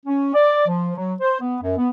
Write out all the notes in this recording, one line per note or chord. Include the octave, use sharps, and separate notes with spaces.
C#4
D5
F3
F#3
C5
B3
F#2
B3